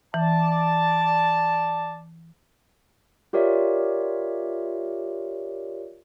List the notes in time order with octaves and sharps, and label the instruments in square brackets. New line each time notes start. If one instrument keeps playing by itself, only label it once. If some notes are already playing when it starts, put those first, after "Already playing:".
[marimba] E3 [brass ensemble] D5 A5
[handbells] F4 G4 A#4 C#5 D5 E5